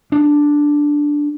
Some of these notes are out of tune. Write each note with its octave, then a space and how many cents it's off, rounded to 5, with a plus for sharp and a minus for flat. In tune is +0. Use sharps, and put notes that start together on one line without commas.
D4 +0